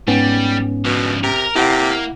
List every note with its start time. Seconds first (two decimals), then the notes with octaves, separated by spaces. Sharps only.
0.08 G#2 G3 B3 C#4
0.85 D2 B2 F3
1.24 C3 A#4
1.55 C3 A#3 E4 F#5